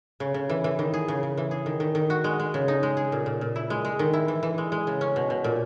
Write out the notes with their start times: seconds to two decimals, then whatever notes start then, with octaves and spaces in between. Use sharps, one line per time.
0.20 C#3
0.34 C#3
0.49 E3
0.64 E3
0.79 D#3
0.94 G#4
1.08 C#3
1.23 C#3
1.37 E3
1.51 G#4
1.66 D#3
1.80 D#3
1.95 D#3
2.10 F#4
2.24 G#3
2.39 G#3
2.54 C#3
2.68 D#4
2.83 G#3
2.97 G#4
3.12 A#2
3.26 A#2
3.41 A#2
3.56 E4
3.70 G#3
3.85 G#3
3.99 D#3
4.13 E4
4.28 E3
4.43 E3
4.58 G#3
4.72 G#3
4.87 C#3
5.01 C#4
5.16 B2
5.30 B2
5.44 A#2